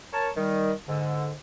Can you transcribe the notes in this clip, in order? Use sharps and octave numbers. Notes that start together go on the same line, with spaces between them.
A#4 C#5 A5
D#3 G3
G#2 D3